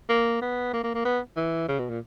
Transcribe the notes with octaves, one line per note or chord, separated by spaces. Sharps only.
A#3
B3
A#3
A#3
A#3
B3
E3
C#3
B2
A#2